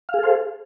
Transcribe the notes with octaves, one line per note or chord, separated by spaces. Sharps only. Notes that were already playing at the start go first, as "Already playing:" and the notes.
G#4 A4 C5 F5